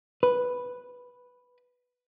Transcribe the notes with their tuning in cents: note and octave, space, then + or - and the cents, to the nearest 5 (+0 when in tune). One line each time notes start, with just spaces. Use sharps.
B4 +0